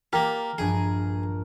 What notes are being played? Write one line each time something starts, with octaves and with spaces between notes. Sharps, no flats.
A#3 G4 A#4 A6
A#1 G2 G#4 G#5